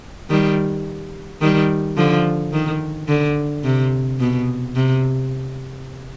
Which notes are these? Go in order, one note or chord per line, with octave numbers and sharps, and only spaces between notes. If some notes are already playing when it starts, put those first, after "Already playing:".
D#3 G3
D#3 G3
D3 F3
D#3
D3
C3
B2
C3